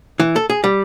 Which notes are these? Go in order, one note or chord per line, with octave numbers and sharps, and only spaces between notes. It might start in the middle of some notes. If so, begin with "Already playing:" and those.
E3
A4
G#4
G3